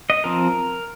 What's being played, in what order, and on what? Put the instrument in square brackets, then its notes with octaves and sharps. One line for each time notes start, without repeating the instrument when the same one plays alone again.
[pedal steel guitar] D#5
F3 C4 A#4